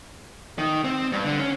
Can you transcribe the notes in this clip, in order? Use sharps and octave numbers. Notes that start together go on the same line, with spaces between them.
D#3
C4
G2
D3
C#4